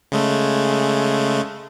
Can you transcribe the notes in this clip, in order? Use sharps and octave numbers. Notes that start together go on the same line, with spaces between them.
C#3 G#3 A3